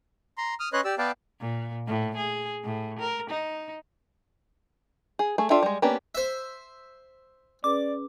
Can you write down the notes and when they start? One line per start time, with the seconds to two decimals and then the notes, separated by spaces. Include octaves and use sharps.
0.38 A#5 C6
0.60 D#6 F6
0.73 C#4 B4 C#5 D#5 C6 F#6
0.85 G4 D5 E6
0.98 B3 B4 D5 F5 G5 A5
1.40 A#2
1.87 A2
2.16 G#4
2.64 A2
2.99 A#4
3.30 D#4
5.19 G#4
5.38 A3 G#4
5.50 D4 F4 A4 E5 G5
5.63 G3 G#3
5.82 A#3 B3 C#4 D4 G4
6.15 C5 E5
7.64 C#4 G#4 B4 D5 D6